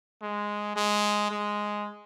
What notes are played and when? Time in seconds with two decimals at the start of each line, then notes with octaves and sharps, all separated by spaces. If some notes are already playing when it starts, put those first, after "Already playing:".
0.22 G#3
0.76 G#3
1.31 G#3